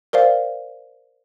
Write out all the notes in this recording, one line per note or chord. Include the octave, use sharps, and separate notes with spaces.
A#4 C5 D5 F5